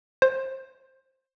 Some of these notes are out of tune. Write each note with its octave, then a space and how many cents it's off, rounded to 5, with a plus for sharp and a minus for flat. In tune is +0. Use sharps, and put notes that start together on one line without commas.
C5 +20